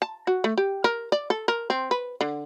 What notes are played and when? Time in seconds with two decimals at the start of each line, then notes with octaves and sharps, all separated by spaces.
0.02 A5
0.27 F#4
0.44 A3
0.57 G4
0.84 A#4
1.12 D5
1.30 A4
1.48 A#4
1.70 C4
1.91 B4
2.21 D3